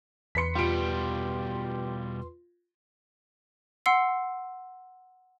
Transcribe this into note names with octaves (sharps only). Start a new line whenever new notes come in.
E2 B4 C6 B6 C#7
B2 G3 F4 G4 D7
F#5 C6 E6 C7